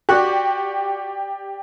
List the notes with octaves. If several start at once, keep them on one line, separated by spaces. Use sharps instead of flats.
F#4 G4 D5 C#6 F#6